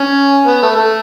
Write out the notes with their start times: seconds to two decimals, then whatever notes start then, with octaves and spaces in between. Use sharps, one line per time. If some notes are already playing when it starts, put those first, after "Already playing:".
Already playing: C#4
0.46 B3
0.62 A3
0.76 A3